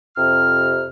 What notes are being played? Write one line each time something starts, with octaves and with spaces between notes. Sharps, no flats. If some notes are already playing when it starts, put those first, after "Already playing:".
F2 C3 F6